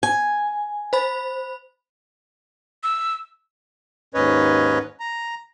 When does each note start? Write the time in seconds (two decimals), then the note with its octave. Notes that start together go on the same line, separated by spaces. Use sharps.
0.03 G#5
0.93 C5 B5
2.83 E6
4.14 D#2 G#2 C#4 B4 C#5 D#5
5.00 A#5